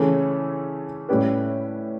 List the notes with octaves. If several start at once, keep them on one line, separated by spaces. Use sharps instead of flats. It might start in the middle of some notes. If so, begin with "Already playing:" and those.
Already playing: C#3 E3 A3 C#4
A2 G3 C#4 G4 B4